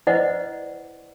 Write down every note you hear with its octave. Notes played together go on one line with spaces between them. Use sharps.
E4 B4 C5 D5 D#5 F#5